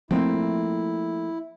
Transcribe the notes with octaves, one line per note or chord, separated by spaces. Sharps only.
F3 A3 A#3 C4 E4